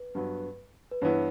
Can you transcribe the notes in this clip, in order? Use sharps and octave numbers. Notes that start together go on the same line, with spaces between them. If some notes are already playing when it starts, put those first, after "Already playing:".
Already playing: B4
G2 F#3 B3
B4
G2 E3 B3 E4 C#5